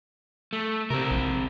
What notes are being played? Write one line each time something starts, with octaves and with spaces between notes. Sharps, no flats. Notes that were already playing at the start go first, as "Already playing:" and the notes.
A3
C3 C4 A#4
A#1